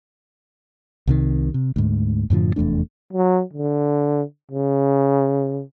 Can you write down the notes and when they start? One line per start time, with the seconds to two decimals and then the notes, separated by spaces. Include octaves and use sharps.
1.07 C2 C3 D#3
1.54 C3
1.76 D2 G#2
2.30 F#2 A2 D3 F3
2.56 F1 E2 A3 D4
3.13 F#3
3.53 D3
4.51 C#3